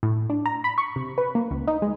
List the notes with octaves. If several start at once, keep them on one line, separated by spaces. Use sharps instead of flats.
A2
D4
A#5
B5
C#6
C3
B4
A#3
C#2
D#4
G#3